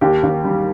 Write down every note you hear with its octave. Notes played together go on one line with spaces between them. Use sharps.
D#2 G4
D#2
G3